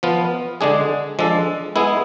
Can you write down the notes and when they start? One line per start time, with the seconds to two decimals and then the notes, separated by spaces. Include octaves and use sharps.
0.03 F3 B3 F4
0.61 D3 G#3 D4 G#4
1.19 F3 G#3 D4 A4
1.76 G#3 B3 E4 G#4